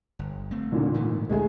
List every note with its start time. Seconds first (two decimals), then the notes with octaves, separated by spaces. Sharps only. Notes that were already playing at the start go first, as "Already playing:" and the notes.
0.19 G1
0.51 A3 C4
0.72 D#2 A#2 D3
0.94 G#2 E3 A3
1.29 G#1 D2 G#3 A3 G#4